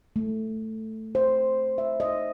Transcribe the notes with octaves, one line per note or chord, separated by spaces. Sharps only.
A3
C5
E5
D#5